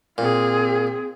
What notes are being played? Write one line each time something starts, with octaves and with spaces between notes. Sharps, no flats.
A#2 C4 G#4